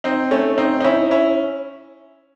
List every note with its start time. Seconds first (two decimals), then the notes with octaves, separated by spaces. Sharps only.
0.04 C4 D#4
0.31 A3 C#4
0.58 C4 D#4
0.80 D#4
0.84 C#4 E4
1.11 C#4 E4